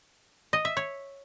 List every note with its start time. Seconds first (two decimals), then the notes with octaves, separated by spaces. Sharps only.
0.53 D#5
0.65 E5
0.77 C#5